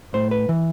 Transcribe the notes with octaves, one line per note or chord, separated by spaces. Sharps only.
A2 C5
B4
E3